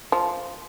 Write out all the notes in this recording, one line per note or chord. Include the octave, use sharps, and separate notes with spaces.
F3